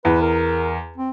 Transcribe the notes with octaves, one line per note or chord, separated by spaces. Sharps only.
E2 B4
A#4
C4